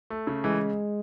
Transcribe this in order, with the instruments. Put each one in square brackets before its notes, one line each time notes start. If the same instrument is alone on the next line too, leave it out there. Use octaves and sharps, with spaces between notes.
[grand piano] A3
C#3
[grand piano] E3 [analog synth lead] G#3